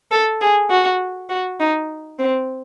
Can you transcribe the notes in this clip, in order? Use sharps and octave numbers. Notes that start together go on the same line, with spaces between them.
A4
G#4
F#4
F#4
D#4
C4